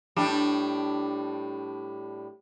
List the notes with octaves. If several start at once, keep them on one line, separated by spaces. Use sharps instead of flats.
A2 G3 D4